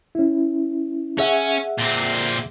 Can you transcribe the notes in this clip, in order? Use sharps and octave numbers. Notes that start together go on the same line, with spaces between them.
C#4 E4
C#4 G#4 E5 F#5
A#2 C4